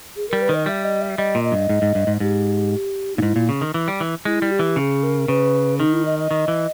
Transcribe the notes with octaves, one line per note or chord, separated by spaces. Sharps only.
G#4
G3 A#4
B4
D#3 D#5
G3 E5
D#5
E5
G3 D#5
A#2
D#5
G2
G#2
G#2
G2
G#2
G#2 G4
A#2 D#4
G#2 E4
A#2
C#3
D#3
E3
G3
E3
G#3 E4
G3
G4
E3
C#3 G#4
A#4
C#3 B4
D#3 D#4
E4
D#5
D#5
D#3
E3